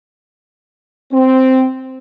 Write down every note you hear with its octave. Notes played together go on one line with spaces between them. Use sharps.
C4